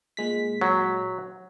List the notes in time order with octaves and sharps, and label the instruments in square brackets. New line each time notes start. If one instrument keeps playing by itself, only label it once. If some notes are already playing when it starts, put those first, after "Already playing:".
[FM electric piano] A#2 G#3 B6
[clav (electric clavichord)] F#3